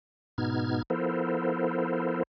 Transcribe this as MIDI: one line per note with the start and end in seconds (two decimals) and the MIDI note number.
0.38 0.82 44
0.38 0.82 47
0.38 0.82 59
0.38 0.82 63
0.38 0.82 89
0.38 0.82 92
0.90 2.23 53
0.90 2.23 59
0.90 2.23 64
0.90 2.23 69
0.90 2.23 70
0.90 2.23 72